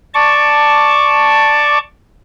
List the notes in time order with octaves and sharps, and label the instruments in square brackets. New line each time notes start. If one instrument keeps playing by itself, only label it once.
[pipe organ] D5 A5 C#6 D6